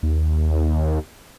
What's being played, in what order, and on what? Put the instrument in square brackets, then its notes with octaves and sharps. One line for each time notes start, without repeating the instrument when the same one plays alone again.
[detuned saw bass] D#2